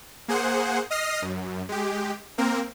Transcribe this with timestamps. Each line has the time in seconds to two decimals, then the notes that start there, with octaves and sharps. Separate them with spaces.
0.28 A#3 G#4 C5 F#5
0.91 D#5 D#6 F6 A#6 C7
1.22 F#2
1.69 G#3 G4
2.38 A#3 C4 A#4